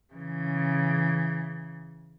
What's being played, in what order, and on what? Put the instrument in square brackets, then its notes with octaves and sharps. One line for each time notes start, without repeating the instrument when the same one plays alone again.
[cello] C#3 E3